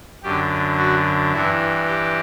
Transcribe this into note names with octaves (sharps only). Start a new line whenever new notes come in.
F#2 D3 G4
F#4
G2 E3 E4
G4